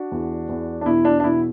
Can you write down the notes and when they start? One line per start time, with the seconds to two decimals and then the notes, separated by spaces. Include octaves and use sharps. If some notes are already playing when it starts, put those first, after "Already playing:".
Already playing: D4 F#4
0.12 E2
0.49 E2
0.81 D4
0.86 B2 E4
1.05 D4
1.20 D4
1.24 B2 E4